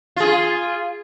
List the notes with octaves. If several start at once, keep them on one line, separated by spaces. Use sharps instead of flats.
F4 G#4